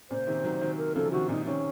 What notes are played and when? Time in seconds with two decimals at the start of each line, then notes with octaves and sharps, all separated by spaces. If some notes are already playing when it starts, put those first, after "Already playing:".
0.10 A#2 C#3 C5
0.27 C3 D#3
0.44 D#3 F#3
0.61 D#3 F#3
0.78 A#4
0.96 C#3 F3 A4
1.12 C3 D#3 F#4
1.29 A#2 C#3 D#4
1.46 C3 D#3 C#4